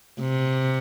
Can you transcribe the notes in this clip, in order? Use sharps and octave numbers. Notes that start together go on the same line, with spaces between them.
C3